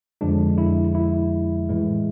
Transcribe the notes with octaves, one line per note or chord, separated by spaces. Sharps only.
F2 D3 F3 G#3 D4
E4
E4
A2 E3 G#3